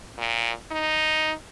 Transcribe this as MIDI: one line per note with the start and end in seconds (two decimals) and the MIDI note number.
0.18 0.51 46
0.72 1.33 63